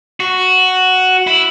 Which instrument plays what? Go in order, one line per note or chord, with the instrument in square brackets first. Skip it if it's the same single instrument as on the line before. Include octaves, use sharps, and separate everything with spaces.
[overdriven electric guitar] F#4
E4